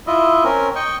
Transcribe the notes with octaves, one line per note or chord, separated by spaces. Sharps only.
E4 F4 D#5 E5
C4 C#4 A#4
D#5 G5 C#6